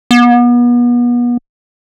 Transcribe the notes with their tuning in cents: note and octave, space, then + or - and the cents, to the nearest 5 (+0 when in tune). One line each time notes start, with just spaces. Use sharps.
B3 -35